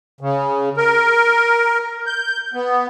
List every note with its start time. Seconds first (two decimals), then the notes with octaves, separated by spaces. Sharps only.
0.21 C#3
0.77 A#4
2.06 G6
2.54 B3